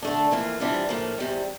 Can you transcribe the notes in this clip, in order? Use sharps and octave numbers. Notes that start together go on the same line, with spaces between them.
D3 A3 D4
F2 E3 A#3 F4
C3 E3 G3 D4 F4
A2 F3 A#3
E2 C3 G3